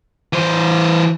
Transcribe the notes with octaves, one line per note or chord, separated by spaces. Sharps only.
E3 C5